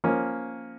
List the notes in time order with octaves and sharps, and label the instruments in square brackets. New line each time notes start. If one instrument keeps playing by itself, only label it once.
[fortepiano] F3 A#3 C#4